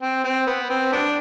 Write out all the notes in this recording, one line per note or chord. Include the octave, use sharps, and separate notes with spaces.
C4
C4
B3
C4
B3 D4